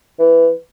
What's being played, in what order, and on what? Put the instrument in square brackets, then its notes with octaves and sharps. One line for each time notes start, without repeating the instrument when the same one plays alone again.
[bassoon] E3